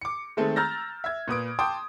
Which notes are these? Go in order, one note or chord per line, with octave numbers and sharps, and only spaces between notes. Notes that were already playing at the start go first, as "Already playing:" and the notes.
D6 C#7
D#3 G#3 A3 C4 A4
A#5 E6 F6 G6 A6 A#6
E5 G#6
A#2 B4 D#6 D7
G5 A5 C6 D6 D#6